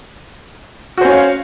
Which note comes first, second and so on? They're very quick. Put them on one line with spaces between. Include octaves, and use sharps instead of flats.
F#4 C5 C#4 C#5 F5